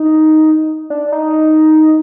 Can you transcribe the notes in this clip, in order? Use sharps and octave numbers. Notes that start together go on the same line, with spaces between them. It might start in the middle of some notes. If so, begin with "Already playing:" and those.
Already playing: D#4
D4
D#4